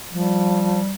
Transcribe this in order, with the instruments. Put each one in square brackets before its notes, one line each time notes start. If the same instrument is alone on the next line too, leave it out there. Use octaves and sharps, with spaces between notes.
[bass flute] F3 [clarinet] G3